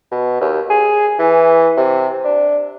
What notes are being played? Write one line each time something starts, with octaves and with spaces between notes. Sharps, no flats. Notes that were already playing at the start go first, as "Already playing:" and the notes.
B2
D#2
G#4
E3
C3
D4